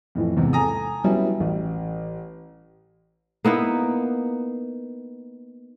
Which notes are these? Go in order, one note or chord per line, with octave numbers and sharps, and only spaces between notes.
F2 A2 E3
E2 G#2 C3
A4 G#5 A#5 D#6
F#3 G3 B3 C#4 E4
A1
A#3 B3 D#4 E4